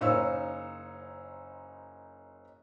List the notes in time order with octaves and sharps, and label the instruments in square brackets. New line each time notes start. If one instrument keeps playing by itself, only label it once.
[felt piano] F#1 D#4 C5 C#5 F5 E6